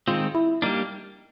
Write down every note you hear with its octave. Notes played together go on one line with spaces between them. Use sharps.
D#3 G#3 C4 F4
E4
G3 A#3 D4 D#4